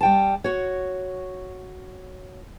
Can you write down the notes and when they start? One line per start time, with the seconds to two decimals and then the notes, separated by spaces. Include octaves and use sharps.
0.01 G3 G5 A5
0.44 F#4 C#5